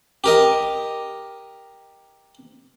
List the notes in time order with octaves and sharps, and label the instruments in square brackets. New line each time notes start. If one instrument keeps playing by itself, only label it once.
[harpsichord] G4 A#4 D#5